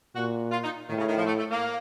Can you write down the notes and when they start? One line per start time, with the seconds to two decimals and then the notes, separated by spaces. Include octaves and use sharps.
0.15 A#2 F#4
0.52 F4
0.64 D#4
0.89 A2 D#3
0.98 C#3
1.08 D#3
1.17 F3
1.27 A3
1.39 A3
1.51 A#3